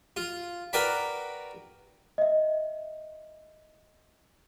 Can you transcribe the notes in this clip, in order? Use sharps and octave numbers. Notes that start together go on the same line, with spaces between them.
F4
F#4 A#4 B4 D5 G5 B5
D#5 E5